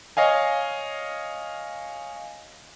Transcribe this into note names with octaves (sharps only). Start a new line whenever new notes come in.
C#5 D#5 F5 G#5